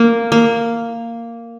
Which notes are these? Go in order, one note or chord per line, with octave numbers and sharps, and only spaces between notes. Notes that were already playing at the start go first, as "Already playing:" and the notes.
Already playing: A#3
A#3